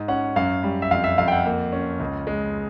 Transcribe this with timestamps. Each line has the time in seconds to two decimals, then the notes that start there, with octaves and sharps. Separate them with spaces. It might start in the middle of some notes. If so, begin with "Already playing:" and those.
Already playing: G#2
0.08 C#4 F#5
0.36 F#2 F5
0.63 G3
0.82 E5
0.91 F2 F5
1.04 E5
1.18 F2 F5
1.28 G5
1.32 F#5
1.46 A#3
1.72 C#4
2.00 C#2
2.27 G#3